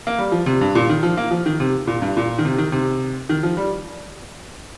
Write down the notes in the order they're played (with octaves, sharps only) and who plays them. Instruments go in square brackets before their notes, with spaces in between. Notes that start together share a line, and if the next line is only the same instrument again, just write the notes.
[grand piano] A#3
G3
F3
C3
G2
A#2
D#3
F3
A#3
F3
D#3
C3
A#2
G2
A#2
D#3
C3
D#3
C3
D#3
F3
G3